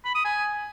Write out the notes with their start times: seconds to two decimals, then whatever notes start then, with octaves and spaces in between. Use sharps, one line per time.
0.05 B5
0.15 D#6
0.25 G#5